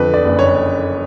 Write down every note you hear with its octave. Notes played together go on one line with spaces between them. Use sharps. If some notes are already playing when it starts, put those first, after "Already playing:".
Already playing: F2 D3 A4 B4
D5
F#1
C#5